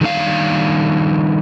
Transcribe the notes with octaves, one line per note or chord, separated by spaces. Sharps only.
D#3 G3 D4 F5